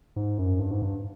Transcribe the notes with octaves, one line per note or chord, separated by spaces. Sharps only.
G#2
F#2
G2
G#2
G2